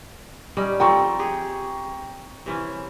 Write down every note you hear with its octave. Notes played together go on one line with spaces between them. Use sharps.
G3 C#4 D#4
F3 C4 A4 G5 A#5 C#6
G4 G#4
C3 E3 C#4